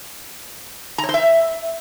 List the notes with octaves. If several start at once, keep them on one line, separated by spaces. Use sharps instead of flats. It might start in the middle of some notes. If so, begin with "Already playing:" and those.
A#5
C#5
C5
E5